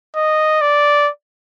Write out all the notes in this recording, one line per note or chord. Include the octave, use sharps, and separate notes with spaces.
D#5
D5